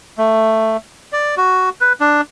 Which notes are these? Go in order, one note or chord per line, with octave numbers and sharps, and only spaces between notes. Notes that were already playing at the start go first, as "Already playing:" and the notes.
A3
D5
F#4
B4
D4